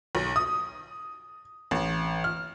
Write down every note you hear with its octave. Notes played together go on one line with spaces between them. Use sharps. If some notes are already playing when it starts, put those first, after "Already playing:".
B1
D#6
A1
F6